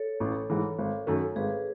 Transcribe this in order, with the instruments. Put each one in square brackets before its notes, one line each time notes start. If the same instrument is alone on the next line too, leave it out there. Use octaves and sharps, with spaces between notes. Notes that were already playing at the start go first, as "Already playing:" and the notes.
Already playing: [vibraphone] A4 C#5
[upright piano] A1
G#2 E3
G#1
F#2 D#3 A3
[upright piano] G#1 [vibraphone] G#4 B4